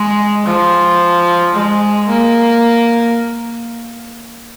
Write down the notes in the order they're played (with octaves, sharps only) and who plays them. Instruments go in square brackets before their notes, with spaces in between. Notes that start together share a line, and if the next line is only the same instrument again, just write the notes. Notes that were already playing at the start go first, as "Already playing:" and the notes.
Already playing: [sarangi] G#3
F3
G#3
A#3